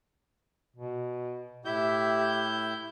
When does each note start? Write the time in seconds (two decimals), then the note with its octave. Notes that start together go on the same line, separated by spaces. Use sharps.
0.76 B2
1.65 A2 E4 G4 E5 G6